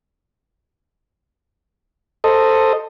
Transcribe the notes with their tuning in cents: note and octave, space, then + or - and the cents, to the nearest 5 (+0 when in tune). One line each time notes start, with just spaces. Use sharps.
A4 +10 C5 +0 D#5 +0